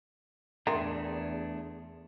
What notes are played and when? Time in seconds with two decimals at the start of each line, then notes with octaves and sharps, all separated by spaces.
0.67 E2 A3 D4 G#4 A#4 E5 G5 C6